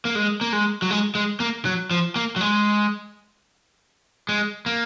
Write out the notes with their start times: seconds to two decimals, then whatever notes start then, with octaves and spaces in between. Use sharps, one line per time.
0.05 A#3
0.15 G#3
0.41 A#3
0.53 G#3
0.82 F#3
0.91 G#3
1.15 G#3
1.40 A#3
1.65 F#3
1.91 F3
2.16 A#3
2.36 F#3
2.41 G#3
4.29 G#3
4.66 A#3